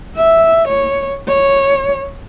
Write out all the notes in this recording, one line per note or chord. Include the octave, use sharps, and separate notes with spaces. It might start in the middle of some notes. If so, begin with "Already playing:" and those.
E5
C#5
C#5